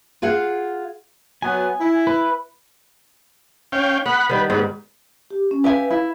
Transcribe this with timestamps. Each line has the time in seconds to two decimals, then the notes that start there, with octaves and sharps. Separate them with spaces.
0.22 F4 G#4 F5 F#5
1.42 F#3 B3 G#5
1.80 E4
2.07 B4
3.72 C#4 F5 G5
4.06 B3 F#5 B5
4.29 D#3 G3 B4
4.50 G#2 G3 B3
5.31 G4
5.51 C#4
5.64 G4 B4 E5 F5 G#5
5.90 E4